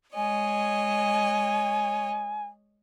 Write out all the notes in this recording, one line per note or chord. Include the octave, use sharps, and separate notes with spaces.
G#3 C#5 D#5 G#5